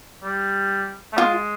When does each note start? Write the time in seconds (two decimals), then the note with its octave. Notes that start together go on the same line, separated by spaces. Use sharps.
0.23 G3
1.13 A3
1.17 G#3 F4